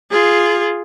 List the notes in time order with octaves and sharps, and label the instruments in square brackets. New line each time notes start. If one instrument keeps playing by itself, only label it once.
[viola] F4 G#4